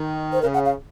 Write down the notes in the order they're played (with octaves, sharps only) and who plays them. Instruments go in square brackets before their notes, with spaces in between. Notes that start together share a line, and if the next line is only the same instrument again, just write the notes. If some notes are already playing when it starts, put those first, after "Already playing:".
Already playing: [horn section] D#3
[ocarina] C5
[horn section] C#3 [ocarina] A#4
[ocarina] F#5
F5